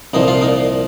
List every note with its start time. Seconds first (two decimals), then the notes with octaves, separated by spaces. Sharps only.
0.14 C2 A#2 F3 D#4
0.28 F4
0.42 D#4